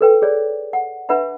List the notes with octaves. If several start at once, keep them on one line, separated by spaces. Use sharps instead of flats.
A4 B4 G5
G#4 C#5 D5
F#5
D4 B4 E5 F#5 B5